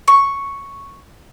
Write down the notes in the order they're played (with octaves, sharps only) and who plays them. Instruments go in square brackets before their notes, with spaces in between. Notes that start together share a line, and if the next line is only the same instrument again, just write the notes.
[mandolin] C#6